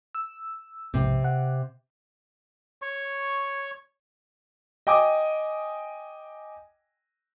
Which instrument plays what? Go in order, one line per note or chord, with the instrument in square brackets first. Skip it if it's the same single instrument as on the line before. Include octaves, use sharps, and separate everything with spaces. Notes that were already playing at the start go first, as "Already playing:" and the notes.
[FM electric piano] E6
[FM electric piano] B1 F2 G#2 [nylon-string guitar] C3
[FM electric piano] F#5
[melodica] C#5 C#6
[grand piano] D#5 G5 G#5 D6 D#6